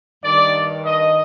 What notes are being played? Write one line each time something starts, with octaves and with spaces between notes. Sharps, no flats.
G2 D#3 D5
D#5